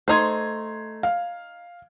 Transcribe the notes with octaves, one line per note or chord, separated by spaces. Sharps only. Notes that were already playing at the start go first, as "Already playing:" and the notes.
A3 D#4 C5 C6 G#6
F5